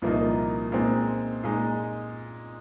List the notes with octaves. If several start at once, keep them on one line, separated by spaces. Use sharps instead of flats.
C2 A#2 F3 A#3 D#4
A#2 G#3 C4 D#4
A#2 G#3 D#4